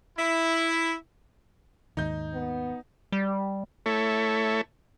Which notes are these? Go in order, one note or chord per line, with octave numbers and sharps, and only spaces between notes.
E4
D#2 G#2 D#3 D#4 G6
B3
G3
A3 E4 A4 C#5